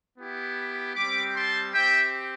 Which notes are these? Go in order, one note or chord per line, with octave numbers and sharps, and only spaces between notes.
B3 E4 G4
G3 C4 G4 B5 D6
A5 C6
C4 G4 E5 G5